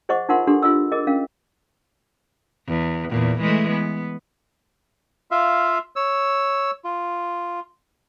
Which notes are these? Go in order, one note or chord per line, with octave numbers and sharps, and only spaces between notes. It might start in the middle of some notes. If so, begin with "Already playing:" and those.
G#4 C5 D#5 F#5 C#6
D#4 F4 A#4 F#5 C6
D4 G4 A4 C6
F4 A4 D#5 E6
G#4 A#4 D#5
C#4 A#4 F5
E2
E2 A#2
E3 G#3 A3
B3
F4 E5 F5
C#5 E6
F4